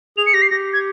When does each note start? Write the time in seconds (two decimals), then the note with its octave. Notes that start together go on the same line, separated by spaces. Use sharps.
0.17 G#4 F7
0.26 C#7
0.34 G4 A#6
0.42 C7
0.50 G4 A#6
0.73 G#6